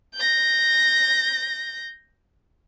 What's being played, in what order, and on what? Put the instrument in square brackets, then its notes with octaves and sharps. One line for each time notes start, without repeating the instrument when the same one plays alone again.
[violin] G6 A#6